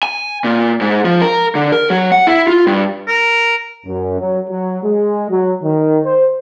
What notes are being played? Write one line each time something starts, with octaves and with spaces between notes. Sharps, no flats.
G#5
A#2
G#2
F3
A#4
D3
A#4
F#3
F#5
E4
F4
G2
A#4
F#2
F#3
F#3
G#3
F#3
D#3
C5